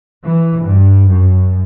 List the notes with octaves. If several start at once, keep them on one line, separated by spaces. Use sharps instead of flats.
E3
G2
F#2